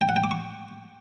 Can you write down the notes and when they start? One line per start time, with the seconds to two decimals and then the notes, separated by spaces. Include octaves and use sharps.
0.01 G5
0.09 F#5
0.16 G5
0.24 D6
0.31 C#6